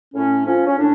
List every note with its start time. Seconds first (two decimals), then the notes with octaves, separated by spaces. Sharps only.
0.15 A2 C#4
0.46 F3 C#4
0.67 C#4
0.78 A2 D4